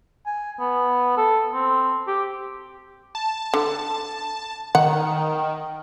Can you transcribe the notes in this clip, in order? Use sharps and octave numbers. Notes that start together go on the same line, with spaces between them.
G#5
B3
A4
C4
G4
A5
D3
D#3 F#5